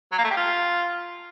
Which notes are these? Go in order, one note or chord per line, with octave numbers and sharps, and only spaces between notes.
F#3
A#3
A3
G4
F4